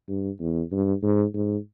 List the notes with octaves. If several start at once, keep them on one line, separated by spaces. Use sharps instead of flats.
G2
E2
G2
G#2
G#2